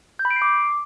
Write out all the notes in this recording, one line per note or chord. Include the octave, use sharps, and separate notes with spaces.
G6
B5
D7
C7
D6